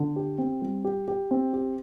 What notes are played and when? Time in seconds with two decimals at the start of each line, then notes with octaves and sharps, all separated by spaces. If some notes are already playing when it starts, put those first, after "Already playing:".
Already playing: D3
0.16 G4
0.38 C4
0.62 G3
0.84 G4
1.08 G4
1.31 C4
1.53 G4